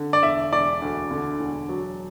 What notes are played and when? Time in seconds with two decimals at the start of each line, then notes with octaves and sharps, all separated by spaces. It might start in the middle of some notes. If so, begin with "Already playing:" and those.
Already playing: D3
0.13 D5
0.23 E1 E5
0.52 E1 D5
0.82 D2
1.11 D3
1.40 E1
1.69 F#3